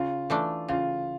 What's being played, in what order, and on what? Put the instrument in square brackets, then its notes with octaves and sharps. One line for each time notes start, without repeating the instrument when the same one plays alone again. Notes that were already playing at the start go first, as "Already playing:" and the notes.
Already playing: [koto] C#3 [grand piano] F4
[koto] E3 A3 D4
[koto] C#3 [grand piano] F4